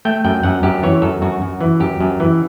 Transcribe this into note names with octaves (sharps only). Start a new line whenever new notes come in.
A3 G5
F#2 G5
F#2 F#5
F#2 G4
E3 C#5
F#2 A4
F#2 F#4
F#2
E3
F#2 G4
F#2
E3